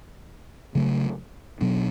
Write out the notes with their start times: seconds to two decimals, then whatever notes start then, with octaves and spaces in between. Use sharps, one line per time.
0.75 C#3 F#3 A3
1.61 B2 F#3 B3 D4